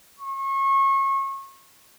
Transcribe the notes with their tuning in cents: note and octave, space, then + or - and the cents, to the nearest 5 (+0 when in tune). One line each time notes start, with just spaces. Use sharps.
C#6 -30